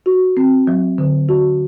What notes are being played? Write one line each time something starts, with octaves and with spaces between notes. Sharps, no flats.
F#4
C4
F#3
D3
F#4